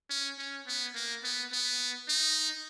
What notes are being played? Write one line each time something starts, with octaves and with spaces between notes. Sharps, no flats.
C#4
C#4
B3
A#3
B3
B3
D#4